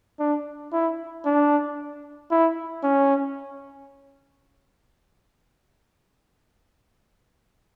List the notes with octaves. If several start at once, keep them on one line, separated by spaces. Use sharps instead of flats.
D4
E4
D4
E4
C#4